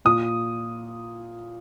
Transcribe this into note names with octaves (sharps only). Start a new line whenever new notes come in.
A#2 D#6